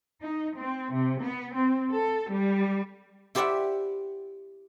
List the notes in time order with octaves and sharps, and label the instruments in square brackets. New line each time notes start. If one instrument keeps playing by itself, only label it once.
[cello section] D#4
C4
C3
B3
C4
A4
G3
[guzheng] E4 G4 C5 D5 E5 F#5